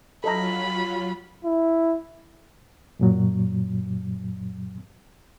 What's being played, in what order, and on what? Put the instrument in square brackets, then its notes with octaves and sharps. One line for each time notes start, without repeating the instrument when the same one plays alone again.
[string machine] F#3 F4 [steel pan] A4 D#5 A#5 [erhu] B5
[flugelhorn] E4
[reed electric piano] F#2 A#2 F#3